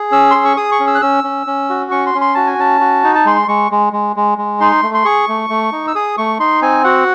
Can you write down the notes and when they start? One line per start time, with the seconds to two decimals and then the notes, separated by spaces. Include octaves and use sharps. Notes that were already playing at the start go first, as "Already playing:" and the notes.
Already playing: G#4
0.11 C#4 E6
0.31 G#4 C6
0.45 C#6
0.57 G#4 D#6
0.72 C#6
0.80 C#4
0.87 E6
0.95 F#6
1.01 C#4 E6
1.24 C#4
1.47 C#4
1.70 F#4
1.91 C#4 C#6
2.07 C6
2.14 C#4
2.21 C6
2.35 F#4 A5
2.47 G#5
2.58 C#4 A5
2.81 F#4
3.04 D#4
3.15 A5
3.25 G#3 C6
3.48 G#3 C#6
3.71 G#3
3.93 G#3
4.16 G#3
4.38 G#3
4.60 D#4 C6
4.83 A3
4.94 C6
5.05 G#4 C#6
5.28 A3
5.50 A3
5.72 D#4
5.87 E6
5.95 G#4 D#6
6.18 A3 C#6
6.39 D#4 C6
6.62 C4 G#5
6.84 F#4 F#5